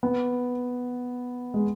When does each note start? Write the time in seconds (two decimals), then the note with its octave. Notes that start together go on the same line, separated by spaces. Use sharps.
0.03 B3
1.54 G#3